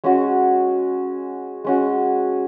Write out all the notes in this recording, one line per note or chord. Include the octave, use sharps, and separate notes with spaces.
G#3 C#4 F#4
G#3 C#4 F#4